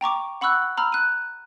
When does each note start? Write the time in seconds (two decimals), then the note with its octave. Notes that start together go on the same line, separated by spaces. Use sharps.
0.01 G5 A#5 C#6 D6
0.41 F#5 B5 C#6 E6 F#6
0.77 A#5 B5 E6 F6
0.92 F#6 D#7